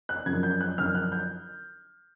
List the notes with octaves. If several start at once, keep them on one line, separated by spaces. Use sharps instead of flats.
F#6
F#2 C#3 F3 G#6
G6
F#6
F#2 D3 F3 F6
F#6
G6